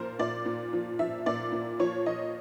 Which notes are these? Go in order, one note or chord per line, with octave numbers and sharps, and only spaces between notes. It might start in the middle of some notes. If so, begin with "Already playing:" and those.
Already playing: A#2 F3 A#4 C5
A#2 D5
A#2
F3
F3 E5
A#2 D5
A#2
F3 C#5
F3 D#5